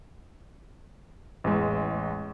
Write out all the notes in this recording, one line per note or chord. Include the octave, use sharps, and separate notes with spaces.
A1 E2 G#3